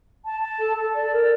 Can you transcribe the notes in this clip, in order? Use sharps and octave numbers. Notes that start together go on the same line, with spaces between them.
A5
A5
A4
A4
D5
A#4